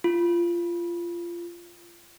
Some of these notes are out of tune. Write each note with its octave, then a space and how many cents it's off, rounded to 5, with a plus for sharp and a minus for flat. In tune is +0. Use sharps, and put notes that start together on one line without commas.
F4 -20